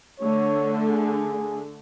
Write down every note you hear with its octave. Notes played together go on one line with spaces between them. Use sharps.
D3 A3 C#5
G#4